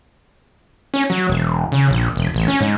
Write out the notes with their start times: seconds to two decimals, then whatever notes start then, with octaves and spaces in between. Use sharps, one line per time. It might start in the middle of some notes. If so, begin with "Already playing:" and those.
0.94 C#4
1.10 F#3
1.29 E1
1.72 C#3
1.90 A#1
2.16 E1
2.34 A1
2.48 C#4
2.61 G#2